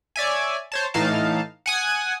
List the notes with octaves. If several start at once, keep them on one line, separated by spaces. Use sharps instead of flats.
C#5 D5 E5 G#5
C5 C#5 A5
A2 E3 D#4 F5 A5
F#5 G#5 D#6